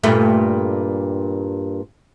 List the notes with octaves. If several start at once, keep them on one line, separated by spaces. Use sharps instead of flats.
G2 A#2 A3